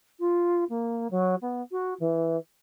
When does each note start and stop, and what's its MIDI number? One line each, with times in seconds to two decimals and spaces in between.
0.20 0.64 65
0.70 1.08 58
1.11 1.35 54
1.42 1.62 59
1.72 1.94 66
2.00 2.37 52